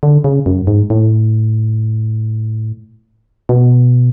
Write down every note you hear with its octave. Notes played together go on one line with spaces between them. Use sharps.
D3
C#3
F#2
G#2
A2
B2